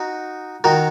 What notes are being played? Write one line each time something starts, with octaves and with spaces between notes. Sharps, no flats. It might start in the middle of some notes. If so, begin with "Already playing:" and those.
Already playing: D#4 F#4
D#3 F#4 A#4